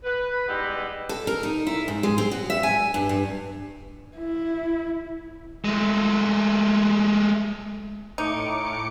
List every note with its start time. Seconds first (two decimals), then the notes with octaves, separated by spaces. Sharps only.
0.04 B4
0.47 G3 G#3 B3 D#4 E4 G4
1.09 A4
1.27 A#4
1.43 D#4
1.67 E4
1.88 G#2
2.03 G#3
2.18 C4
2.31 F#4
2.50 E5
2.63 G#5
2.94 G2
3.09 G2
4.17 E4
5.65 G#3 A3
8.18 A2 D#4 D6 C#7